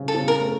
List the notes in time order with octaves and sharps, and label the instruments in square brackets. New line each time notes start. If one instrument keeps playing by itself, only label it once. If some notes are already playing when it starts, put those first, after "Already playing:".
Already playing: [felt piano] C#3 C4
[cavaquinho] A4
[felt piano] C#3
[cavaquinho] A#4
[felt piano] A3